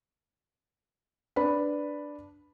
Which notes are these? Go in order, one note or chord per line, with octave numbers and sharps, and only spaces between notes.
D4 B4 B5